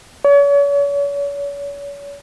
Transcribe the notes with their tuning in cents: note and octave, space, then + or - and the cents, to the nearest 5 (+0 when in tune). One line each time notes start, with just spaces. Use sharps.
C#5 +40